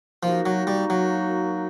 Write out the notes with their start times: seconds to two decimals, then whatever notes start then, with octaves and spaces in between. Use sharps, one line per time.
0.23 F3 A#3 D#4 F#4
0.46 F#3
0.67 G3
0.90 F#3